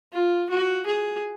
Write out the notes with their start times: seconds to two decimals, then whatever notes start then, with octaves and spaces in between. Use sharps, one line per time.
0.13 F4
0.50 F#4
0.86 G#4